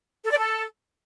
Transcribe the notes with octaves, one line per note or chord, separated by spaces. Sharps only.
A4
D5
A4